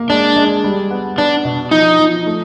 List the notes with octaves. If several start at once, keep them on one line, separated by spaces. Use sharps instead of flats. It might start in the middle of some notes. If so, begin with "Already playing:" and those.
Already playing: A#3
G#3 D4
G#3
G3
B3
B3 D4
B2
F3 D#4
F3
A3